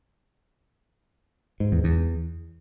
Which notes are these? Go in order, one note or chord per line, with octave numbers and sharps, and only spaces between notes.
G#2
E2
E2